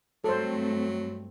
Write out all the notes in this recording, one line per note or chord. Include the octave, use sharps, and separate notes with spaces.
G2 F#3 A3 C4 A4 C5